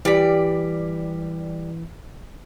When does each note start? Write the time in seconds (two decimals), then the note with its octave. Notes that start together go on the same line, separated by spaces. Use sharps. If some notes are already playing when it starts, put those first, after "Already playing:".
0.05 E3 G3 D5 B6